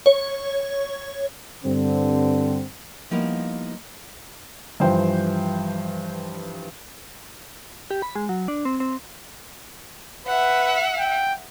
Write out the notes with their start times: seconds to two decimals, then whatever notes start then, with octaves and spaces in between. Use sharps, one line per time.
0.06 C#5
1.64 G2 D3 C4
3.11 F3 G3 A#3 B3 D#4 E4
4.80 G2 E3 F3 C5 G5
7.91 G4
8.02 B5
8.16 G#3
8.29 F#3
8.48 D4
8.65 C4
8.80 C4
10.27 B4 E5 F#5
10.99 G5